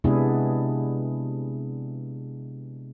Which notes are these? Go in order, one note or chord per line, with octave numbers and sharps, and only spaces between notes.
C3 G#3 B3 D4 E4 G#4